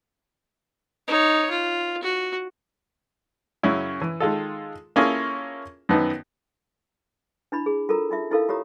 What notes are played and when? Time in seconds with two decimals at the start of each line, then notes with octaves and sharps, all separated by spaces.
1.08 D#4 C#5
1.50 F4
2.03 F#4
3.63 F#2 C#3 C#4 E4
4.01 E3
4.20 D#3 G#3 F4 A4
4.96 A#3 C#4 E4 F4 G#4 A4
5.89 F#2 D#3 F3 B3 D#4
7.52 D4 E4 B5
7.66 G#4
7.89 F4 A4 A#4 A#5
8.11 D#4 F4 E5
8.31 D#4 E4 F#4 A4 A#4 F5
8.48 E4 F4 G4 C#5 A#5 D#6